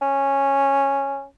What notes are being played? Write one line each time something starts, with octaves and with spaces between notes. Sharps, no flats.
C#4